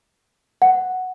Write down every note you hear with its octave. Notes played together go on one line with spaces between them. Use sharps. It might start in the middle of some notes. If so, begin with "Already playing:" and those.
F#5